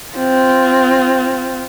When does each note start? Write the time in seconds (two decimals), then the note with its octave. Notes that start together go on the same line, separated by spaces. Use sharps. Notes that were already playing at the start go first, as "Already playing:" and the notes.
0.15 C4 F4